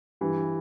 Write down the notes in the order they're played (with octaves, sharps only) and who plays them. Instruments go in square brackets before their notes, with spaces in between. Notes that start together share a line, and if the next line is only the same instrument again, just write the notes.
[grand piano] G2 E3 G3